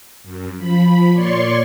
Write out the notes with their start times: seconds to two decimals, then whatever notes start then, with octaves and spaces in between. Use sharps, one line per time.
0.24 F#2
0.58 F3 B5
1.13 A#2 C#5 D5 C6 C#6